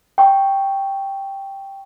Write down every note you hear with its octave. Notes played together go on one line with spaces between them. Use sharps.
G5 C#6